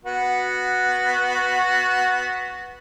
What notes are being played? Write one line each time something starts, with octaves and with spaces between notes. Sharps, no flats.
B3 F#4